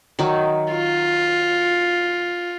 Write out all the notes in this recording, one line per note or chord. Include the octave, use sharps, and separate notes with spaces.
D#3 F#3 D#4
F4